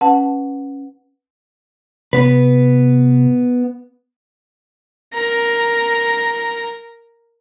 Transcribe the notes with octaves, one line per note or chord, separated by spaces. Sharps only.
C#4 B4 F#5 A5
C3 B3 B4
A#4 A#5